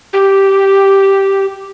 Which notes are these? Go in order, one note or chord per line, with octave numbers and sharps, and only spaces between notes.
G4